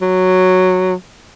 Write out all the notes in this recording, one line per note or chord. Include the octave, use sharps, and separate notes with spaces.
F#3